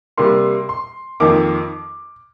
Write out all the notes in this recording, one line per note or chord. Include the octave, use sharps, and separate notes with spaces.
C3 G3 A#3 C6
C6
F2 D#3 A#3 D6